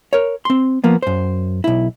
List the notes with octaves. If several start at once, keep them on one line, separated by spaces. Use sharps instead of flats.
A#4 C#5
C4 C6
F3 A#3 B3
F#2 C5
B1 E4